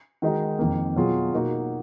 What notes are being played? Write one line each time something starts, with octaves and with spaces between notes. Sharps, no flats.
D#3 G#3 D#4 F#4
F2 D#3 A#3
B2 F#3 B3 F4 G#4
B2 A#3 D#4 F#4